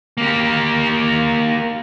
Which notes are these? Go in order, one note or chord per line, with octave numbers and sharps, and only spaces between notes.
A#3 G4